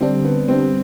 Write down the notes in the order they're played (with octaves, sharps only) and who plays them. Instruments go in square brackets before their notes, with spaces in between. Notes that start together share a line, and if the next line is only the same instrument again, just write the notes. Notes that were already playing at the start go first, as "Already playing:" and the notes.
[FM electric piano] D3 G3 D4 [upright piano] C4
[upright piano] B3
[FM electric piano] D3 G3 D4 [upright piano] C4